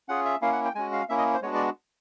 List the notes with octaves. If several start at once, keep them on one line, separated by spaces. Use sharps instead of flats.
C#4 F4 G#4 F#5
E5
A#3 C#4 E4 F5
F#5
G5
G#3 C#4 F#4 G#5
F5
A#3 C#4 E4 E5
D#5
C5
G#3 B3 D4 F#4 C#5
D5